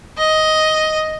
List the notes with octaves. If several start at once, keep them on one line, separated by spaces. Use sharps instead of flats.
D#5